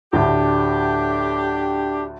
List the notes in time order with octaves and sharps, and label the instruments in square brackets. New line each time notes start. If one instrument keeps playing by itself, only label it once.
[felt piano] D2 A2 [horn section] D4 G4